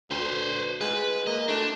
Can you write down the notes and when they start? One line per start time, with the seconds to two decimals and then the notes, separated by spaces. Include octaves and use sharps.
0.11 D2 B4 C5
0.81 G#3 B4
1.27 A#3 D#5
1.48 A3 D4